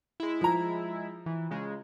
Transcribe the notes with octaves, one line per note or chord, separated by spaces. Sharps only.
G#3 E4
F3 A#5
E3
C#3 G#3